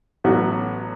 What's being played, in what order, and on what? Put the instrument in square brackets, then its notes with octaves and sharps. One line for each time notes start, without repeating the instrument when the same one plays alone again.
[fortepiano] A1 A2 F#3 B3 F#4